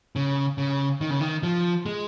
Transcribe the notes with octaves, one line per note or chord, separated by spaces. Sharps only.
C#3
C#3
D#3
C#3
D#3
F3
G#3